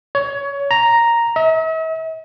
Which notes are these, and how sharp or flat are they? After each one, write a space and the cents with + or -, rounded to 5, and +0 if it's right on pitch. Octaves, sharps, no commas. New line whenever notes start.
C#5 +20
A#5 +0
E5 -45